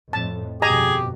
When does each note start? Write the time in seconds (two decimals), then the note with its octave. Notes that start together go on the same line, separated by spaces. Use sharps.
0.13 F2 A2 A5
0.62 G1 F2 B2 G4 G#4 D#5 G#5 A#5